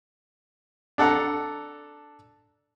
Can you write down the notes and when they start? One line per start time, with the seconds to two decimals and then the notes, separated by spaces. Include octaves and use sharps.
0.98 D4 A4 F#5 A#5